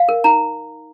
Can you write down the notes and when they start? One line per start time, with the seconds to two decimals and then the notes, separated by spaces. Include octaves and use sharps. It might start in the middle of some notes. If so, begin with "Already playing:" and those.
Already playing: F5
0.09 A#4
0.24 D#4 A#5